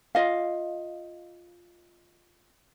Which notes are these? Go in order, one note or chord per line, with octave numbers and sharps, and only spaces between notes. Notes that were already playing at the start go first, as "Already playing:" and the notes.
F4 D#5 F5